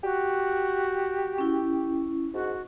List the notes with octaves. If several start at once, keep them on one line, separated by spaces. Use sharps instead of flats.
F#4 G4
C#4 E4
G#2 F#4